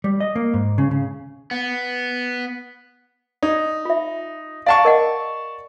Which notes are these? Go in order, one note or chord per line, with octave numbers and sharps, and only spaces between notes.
G3
D#5
A#3
G#2
C#3
C#3
B3
D#4 D5
F4 E5
D5 F5 F#5 A5 A#5 C#6
A#4 D#5 F#5